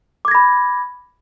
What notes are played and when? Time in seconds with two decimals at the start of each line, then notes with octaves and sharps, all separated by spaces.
0.25 D6
0.28 G#6
0.31 A#6
0.35 B5